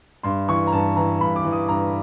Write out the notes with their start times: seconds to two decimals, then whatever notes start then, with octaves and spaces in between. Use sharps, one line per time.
0.23 G2 C6
0.48 E3 C#6
0.67 A#5
0.72 G2 A5
0.96 E3 A#5
1.21 G2 B5
1.36 D6
1.44 E3
1.52 D#6
1.68 G2 A#5